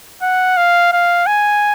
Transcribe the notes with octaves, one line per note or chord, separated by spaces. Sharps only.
F#5
F5
F5
G#5